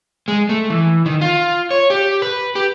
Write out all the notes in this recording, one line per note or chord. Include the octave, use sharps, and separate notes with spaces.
G#3
A3
E3
D#3
F4
C#5
G4
B4
G4